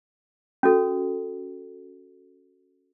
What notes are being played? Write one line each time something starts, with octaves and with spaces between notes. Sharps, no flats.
C#4 F#4 A4